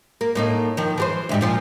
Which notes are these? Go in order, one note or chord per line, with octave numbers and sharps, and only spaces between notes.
A#3
A2 A#3 D#4
D#3 F3
E3 G4 C5
D2 G#2 G3
A#2 F3 F4